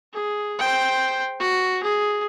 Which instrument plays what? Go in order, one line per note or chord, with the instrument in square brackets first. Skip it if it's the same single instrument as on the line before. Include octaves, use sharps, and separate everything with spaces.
[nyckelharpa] G#4
C5 G5
F#4
G#4